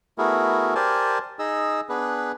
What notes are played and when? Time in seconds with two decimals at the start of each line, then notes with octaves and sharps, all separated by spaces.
0.18 A3 B3 E4 F#4 G#4 A#4
0.75 G4 A#4 C5 D5 G#5 A5
1.39 D#4 G#4 D#5 E6
1.89 B3 D4 G#4 B4